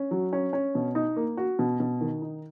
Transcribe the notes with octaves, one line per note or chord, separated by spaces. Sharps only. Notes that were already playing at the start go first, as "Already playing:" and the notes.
Already playing: C#4
F#3
C#4
C#4
B2
D#4
A#3
F#4
B2
B2
D#3
D#4